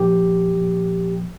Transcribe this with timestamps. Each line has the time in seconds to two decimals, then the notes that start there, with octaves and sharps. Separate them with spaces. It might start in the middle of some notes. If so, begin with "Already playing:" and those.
Already playing: A#2 F3 G4
0.55 F3
0.60 A#2